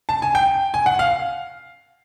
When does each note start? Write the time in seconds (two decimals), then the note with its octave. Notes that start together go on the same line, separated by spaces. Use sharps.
0.09 A5
0.22 G#5
0.35 G5
0.74 G#5
0.86 F#5
0.99 F5